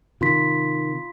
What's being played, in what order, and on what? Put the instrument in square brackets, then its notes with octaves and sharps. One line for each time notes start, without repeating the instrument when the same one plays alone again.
[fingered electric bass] C3 D#3 [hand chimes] F4 C6 B6